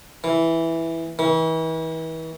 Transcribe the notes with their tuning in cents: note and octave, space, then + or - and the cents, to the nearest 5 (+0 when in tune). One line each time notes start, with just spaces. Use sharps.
E3 -5
E3 -40